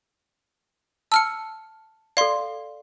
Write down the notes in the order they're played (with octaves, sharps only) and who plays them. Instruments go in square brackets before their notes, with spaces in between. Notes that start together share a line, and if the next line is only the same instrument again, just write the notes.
[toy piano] A5 [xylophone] E6 F6 C#7
[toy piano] A4 D5 [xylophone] F5 C6